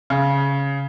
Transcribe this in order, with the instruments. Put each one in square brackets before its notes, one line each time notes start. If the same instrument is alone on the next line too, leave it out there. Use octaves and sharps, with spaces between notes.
[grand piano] C#3